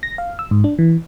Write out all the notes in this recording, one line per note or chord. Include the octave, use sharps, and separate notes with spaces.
A#6
F5
E6
G#2
D4
E3